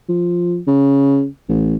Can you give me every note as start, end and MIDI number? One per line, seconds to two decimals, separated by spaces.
0.09 0.59 53
0.67 1.27 49
1.49 1.76 33